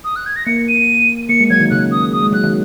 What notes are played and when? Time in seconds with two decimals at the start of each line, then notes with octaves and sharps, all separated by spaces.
0.04 D#6
0.16 F#6
0.26 G#6
0.36 A#6
0.47 A#3 C#7
0.68 D#7
1.29 A#3 C#7
1.40 G#3
1.50 F#3 G#6
1.60 D#3
1.71 C#3 F#6
1.91 D#6
2.12 D#6
2.23 G#3
2.33 F#3 F#6
2.44 D#3